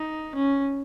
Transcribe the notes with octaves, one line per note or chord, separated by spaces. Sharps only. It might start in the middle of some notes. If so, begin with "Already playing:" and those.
Already playing: D#4
C#4